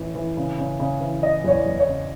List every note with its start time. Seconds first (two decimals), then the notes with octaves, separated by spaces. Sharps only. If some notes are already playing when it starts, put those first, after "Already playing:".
Already playing: A1 A2 E3
0.15 E3
0.37 C#3
0.58 C#3
0.80 C#3
1.00 E3
1.22 E3 D#5
1.44 E2 C#5
1.51 D5
1.66 E2
1.80 C#5
1.87 C#3